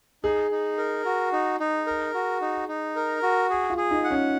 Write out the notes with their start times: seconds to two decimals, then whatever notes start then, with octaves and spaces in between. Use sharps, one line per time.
0.24 D#4 G#4
0.51 D#4
0.78 A#4
1.05 F#4
1.32 D#4
1.60 D#4
1.87 A#4
2.14 F#4
2.41 D#4
2.68 D#4
2.96 A#4
3.23 F#4
3.50 G#4
3.70 F4
3.77 G#4
3.91 D#4
4.04 F#5
4.11 C#4